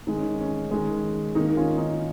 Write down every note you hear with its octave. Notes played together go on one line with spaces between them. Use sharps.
D#3 G#3 D#4
C#4
C#4
D#3 G#3
D#3 A#3 D#4
C#4 F4
D#4